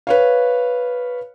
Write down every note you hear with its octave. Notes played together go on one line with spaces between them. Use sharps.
B4 C#5 F5